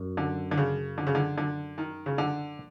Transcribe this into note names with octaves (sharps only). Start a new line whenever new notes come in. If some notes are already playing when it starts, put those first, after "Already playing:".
Already playing: F#2
D3
D3
C#3
D3
C#3
D3
D3
D#3
C#3
D3